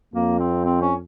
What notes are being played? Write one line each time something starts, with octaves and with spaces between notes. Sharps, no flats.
F2 A#3
C4
C4
C#4